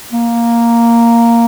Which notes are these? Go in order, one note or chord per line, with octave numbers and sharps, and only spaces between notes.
A#3